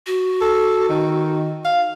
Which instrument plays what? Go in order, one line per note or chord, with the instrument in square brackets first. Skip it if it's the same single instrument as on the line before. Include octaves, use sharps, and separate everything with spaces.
[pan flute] F#4
[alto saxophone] A4
D#3
F5